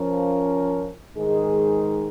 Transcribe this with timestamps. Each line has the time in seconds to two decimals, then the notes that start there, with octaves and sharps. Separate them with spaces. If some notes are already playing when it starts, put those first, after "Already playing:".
Already playing: F3 C#4 A#4
1.16 G#2 D#3 G#3 D#4 G#4